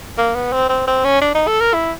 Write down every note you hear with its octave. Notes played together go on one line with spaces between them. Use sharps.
A#3
B3
C4
C4
C4
C#4
D4
D#4
A4
A#4
E4